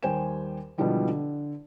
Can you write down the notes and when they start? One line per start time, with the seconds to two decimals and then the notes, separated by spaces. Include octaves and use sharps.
0.03 D#2 G3 C5 G5 G#5 E7
0.78 B2 D3 E3 F3 G3 G#3
1.08 D3